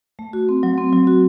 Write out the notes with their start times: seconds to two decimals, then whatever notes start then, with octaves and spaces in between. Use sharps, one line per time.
0.19 A3
0.33 F#4
0.49 C4
0.63 F#3
0.78 C4
0.93 F#3
1.07 F#4